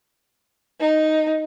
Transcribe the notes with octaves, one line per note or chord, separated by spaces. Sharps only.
D#4